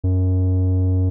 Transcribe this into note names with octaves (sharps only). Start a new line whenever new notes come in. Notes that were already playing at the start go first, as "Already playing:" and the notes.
F#2